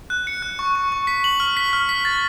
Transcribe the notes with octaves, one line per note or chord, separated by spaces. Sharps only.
F#6
C#7
F#6
C#6
C#6
C#6
B6
F#7
F6
B6
F6
B6
A6